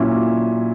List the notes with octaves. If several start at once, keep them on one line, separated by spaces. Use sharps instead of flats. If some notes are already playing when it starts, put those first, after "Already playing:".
Already playing: A#2 F#3 C#4 E4